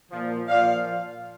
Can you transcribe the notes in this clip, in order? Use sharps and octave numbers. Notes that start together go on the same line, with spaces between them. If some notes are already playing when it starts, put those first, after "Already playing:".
A#2 F3
A#2 F3 D5 F5